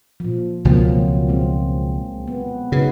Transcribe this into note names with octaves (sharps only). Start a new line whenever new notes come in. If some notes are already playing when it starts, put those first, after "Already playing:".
A#2 F3
C#2 B2 F3 F#3 A#3 C4
G#3 C4
B3
C#3 D#4 F#4 B4